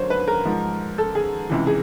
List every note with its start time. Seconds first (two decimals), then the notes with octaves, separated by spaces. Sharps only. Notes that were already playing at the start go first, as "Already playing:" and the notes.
Already playing: D#2 D3 F#3 C5 C#5
0.10 B4
0.28 A#4
0.45 G#2 F3
0.98 A4
1.15 G#4
1.50 C#2 C3 E3
1.67 G#4